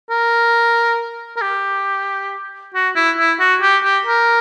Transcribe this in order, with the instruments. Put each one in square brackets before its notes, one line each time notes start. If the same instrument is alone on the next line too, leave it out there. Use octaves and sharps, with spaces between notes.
[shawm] A#4
A#4
G4
F#4
E4
E4
F#4
G4
G4
A#4